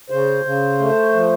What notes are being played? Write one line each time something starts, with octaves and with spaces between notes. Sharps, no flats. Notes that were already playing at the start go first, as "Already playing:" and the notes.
C#3 C5
C#3
A3
F3